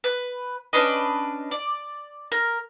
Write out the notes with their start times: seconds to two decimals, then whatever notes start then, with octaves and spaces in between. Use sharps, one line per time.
0.04 B4
0.73 C#4 D4 B4 D#5
1.51 D5
2.32 A#4